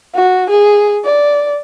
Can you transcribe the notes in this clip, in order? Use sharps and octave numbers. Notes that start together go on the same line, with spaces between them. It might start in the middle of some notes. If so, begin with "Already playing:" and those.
F#4
G#4
D5